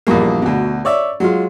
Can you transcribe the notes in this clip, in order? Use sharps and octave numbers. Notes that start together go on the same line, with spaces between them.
A#1 E2 G2 A#3
D2 B2
C#5 D5 E5
F#3 G#3 F4